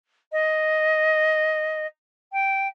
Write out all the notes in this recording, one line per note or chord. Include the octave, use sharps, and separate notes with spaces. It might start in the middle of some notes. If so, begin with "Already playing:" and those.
D#5
G5